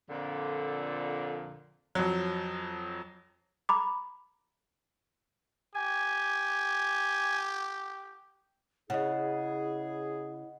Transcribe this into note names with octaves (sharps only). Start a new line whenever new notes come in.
F2 A#2 D3
F2 F#3
A#5 B5 D6
G4 G#5
C#3 E4 G#4 D#5 F#5